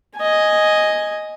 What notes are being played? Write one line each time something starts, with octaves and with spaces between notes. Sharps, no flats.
D#5 G#5